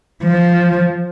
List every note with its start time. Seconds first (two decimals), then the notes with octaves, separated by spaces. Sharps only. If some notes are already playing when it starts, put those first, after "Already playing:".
0.23 F3